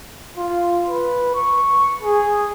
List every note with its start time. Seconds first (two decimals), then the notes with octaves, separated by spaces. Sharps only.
0.37 F4
0.88 B4
1.35 C#6
2.03 G#4